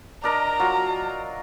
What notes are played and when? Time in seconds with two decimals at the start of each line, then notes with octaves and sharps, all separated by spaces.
0.24 D4 A#4 D#5 A#5
0.60 F#3 F4